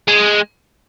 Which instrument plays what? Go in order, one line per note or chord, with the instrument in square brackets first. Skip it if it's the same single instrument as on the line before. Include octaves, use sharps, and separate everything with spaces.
[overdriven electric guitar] G#3